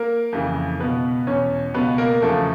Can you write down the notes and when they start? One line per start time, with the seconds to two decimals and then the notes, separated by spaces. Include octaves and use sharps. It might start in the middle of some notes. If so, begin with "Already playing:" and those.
Already playing: A#3 A#4
0.33 F2 C#3 E3
0.80 C#2 B2 B3 B4
1.27 E2 B2 C#4 C#5
1.74 C#2 B2 B3 B4
1.98 A#3 A#4
2.22 E2 C#3 F3 A3 A4